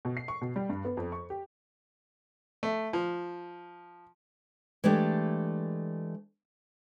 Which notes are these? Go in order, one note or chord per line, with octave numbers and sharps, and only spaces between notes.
B2
C7
C#6
B2
G3
G2
B3
F2
C#6
G4
A3
F3
E3 G#3 A3 D4 G4